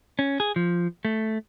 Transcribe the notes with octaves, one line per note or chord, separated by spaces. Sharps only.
C#4
G#4
F3
A3